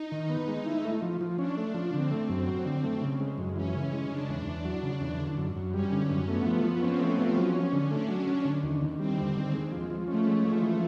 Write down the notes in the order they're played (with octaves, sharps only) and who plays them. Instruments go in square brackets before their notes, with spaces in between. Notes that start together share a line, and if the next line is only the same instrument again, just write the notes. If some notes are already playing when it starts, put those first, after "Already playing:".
Already playing: [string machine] D#4
[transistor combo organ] D#3
B3
G#3
E4
A3
F3
F3
[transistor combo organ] C#4 [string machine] D4
[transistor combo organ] A3
F3
[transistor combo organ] D3 [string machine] C4
[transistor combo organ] A3
F#2
[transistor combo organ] F#3 [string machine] C4
[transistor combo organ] D3
A3
C#3
G#3
F#2
[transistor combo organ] E3 [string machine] C#4
[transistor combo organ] C#3
G#3
[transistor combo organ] C#3 [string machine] D4
[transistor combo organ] E2
E2
F#3
C#3
E2
D3
F#2
F#2
[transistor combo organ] G3 [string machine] C#4
[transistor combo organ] D3
F#2
[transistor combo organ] A3 [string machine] B3
[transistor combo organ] F3
F3
[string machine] C4 [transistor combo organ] C#4
[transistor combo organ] A3
F3
[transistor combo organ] F#3 [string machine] C#4
[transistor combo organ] C#4
D3
[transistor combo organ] A3 [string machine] D4
[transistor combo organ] F#3
C#4
D3
D#2
D#2
[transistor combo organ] G3 [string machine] C4
[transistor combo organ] D3
D#2
G#3
F3
F3
[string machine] A3 [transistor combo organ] C#4
[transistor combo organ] G#3
F3
E3